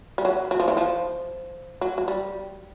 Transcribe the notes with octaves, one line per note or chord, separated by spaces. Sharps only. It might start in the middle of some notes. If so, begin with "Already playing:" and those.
G3
F#3
F#3
F3
E3
F3
F#3
F#3
G3